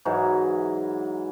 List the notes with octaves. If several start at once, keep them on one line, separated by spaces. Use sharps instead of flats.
G#2 E3 F#3